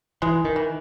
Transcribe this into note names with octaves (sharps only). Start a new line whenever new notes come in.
E3 G#3
D#3
E3